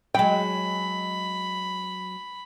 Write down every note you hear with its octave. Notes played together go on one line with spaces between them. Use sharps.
F#3 G#3 G5 B5